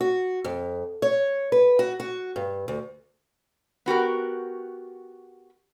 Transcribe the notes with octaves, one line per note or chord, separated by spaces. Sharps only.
F#4
F2
C#5
B4
F#4
F#4
G2
D2
B3 F#4 G4 A#4